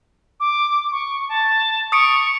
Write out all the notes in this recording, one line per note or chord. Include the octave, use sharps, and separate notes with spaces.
D6
C#6
A5
C#6 D#6 C#7 D7